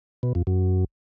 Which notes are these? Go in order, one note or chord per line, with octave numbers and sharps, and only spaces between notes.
B2
F2
F#2